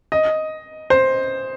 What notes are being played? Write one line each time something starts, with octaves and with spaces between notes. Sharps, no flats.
D#5
C5